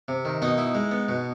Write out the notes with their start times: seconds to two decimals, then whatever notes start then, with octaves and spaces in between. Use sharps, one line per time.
0.08 C3
0.25 D#3
0.42 B2 D#4 D#5
0.58 E4
0.75 G#3
0.91 B3
1.09 B2